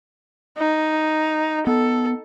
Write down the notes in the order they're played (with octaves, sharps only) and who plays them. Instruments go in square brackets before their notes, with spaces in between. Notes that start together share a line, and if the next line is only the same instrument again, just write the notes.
[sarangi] D#4
[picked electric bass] B3 [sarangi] A4